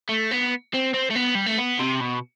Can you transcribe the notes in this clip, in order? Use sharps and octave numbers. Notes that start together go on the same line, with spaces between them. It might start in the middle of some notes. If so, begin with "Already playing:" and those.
A3
B3
C4
C4
A3
B3
G3
A3
B3
C3
B2